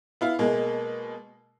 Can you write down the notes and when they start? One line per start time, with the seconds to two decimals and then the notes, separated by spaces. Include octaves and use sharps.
0.21 B3 E4 F5
0.39 B2 G#3 A#3